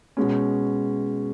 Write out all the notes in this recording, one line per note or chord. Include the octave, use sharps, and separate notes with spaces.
B2 G#3 C#4